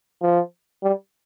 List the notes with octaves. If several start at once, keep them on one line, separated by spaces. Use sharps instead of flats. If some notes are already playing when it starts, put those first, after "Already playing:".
F3
G3